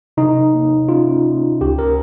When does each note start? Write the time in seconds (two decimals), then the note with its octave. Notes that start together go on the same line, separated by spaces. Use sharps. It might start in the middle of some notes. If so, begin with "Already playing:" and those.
0.17 C3 D#4
0.54 A#3
0.89 C#4 F4
1.25 A#3
1.61 C#2 G4
1.79 A#4